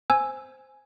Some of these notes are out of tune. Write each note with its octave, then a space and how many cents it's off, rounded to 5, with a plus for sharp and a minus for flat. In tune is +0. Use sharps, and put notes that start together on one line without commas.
C5 +0 G#5 +0 E6 +0